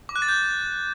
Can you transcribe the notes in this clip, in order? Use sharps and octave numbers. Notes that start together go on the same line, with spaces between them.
D6
F#6
A6
G6